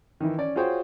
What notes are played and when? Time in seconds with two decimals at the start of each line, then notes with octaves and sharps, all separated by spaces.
0.20 D#3 E3
0.38 C#4 D5
0.56 F4 F#4 G#4 C5 C#5 G5